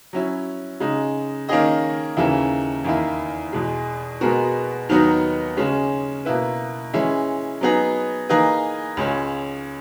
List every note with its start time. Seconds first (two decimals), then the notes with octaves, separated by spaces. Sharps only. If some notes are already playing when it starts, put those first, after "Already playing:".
0.13 F#3 C#4 E4
0.80 C#3 G#3 D#4
1.49 D#3 A#3 C#4 G#4 D#5
2.17 D#2 C#3 E3 A#3 E4
2.84 E2 D#3 A#3 E4
3.53 E2 B2 G#3
4.21 B2 G#3 B3 F#4 A#4
4.89 D#2 D#3 F#3 B3 D#4
5.57 C#3 G#3 C#4
6.25 B2 A#3 E4 B4
6.94 E3 G#3 C#4 E4
7.61 F#3 B3 D#4 G#4 B4
8.29 E3 A#3 D#4 G#4 B4
8.97 C#2 C#3 G#3 C#4